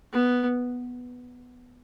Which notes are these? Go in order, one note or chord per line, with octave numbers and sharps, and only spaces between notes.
B3